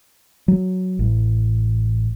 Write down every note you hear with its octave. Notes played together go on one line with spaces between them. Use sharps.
F#3
A1